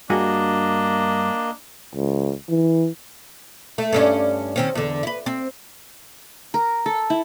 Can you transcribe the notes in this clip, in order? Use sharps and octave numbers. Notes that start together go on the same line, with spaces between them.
G2 A#3 D4 F#4 G#4 D#5
C#2
E3
A3
G2 C#4 D4
D#3 C4 C#4
E2 D3
E4 B4
C4
A#4
A4
E4